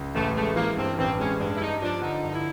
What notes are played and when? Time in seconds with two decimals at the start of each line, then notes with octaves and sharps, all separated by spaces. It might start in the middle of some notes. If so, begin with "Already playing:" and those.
Already playing: C#2
0.15 A1 A3
0.36 G#3 A3
0.56 E3 A#3
0.77 G2 C4
0.98 A1 C4
1.19 G#3 C#4
1.40 G2 D4
1.55 E4
1.60 G2 D#4
1.82 F3 D4
2.02 D3 D#4
2.24 G2 D#4
2.34 E4